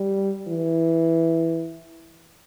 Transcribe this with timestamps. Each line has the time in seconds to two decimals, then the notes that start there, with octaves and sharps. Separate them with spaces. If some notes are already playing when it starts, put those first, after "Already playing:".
Already playing: G3
0.48 E3